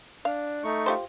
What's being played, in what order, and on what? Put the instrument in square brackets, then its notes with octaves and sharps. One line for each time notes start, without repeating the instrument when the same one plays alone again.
[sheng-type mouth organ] D4 [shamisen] F5
[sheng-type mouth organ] A3 D#4 C#6
[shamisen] F4 G4 C5